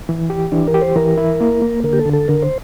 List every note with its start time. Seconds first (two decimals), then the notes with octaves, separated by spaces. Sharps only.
0.09 E3
0.30 G4
0.52 E3 D4
0.67 A#4
0.74 G4
0.81 C5
0.96 E3 A#4
1.18 E4
1.41 A#3
1.62 A#3
1.84 D3 A#4
1.93 G4
1.99 A4
2.06 D3
2.13 A4
2.28 D3 A#4
2.42 C5